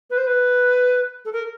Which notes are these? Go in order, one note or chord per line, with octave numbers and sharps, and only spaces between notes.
B4
C5
B4
A4
A#4